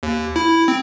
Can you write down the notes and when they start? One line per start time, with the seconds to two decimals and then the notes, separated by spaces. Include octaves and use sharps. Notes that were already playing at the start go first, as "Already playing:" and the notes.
0.03 D#2
0.36 E4
0.68 C4